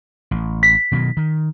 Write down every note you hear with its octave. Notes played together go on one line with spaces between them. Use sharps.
A1
B6
B2 D#3 F#3
D#3